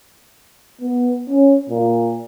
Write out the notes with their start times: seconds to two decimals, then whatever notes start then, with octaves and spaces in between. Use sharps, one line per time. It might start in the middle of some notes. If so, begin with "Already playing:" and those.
0.81 B3
1.30 C#4
1.69 A#2